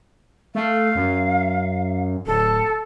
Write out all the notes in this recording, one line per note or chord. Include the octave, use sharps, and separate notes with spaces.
A3 F5
F#2
D1 A4